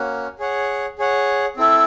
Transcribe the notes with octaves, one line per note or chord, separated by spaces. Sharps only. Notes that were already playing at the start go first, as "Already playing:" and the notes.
Already playing: A#3 C#4 F#4
G#4 C#5 F#5
G#4 C#5 F#5
C4 E4 A4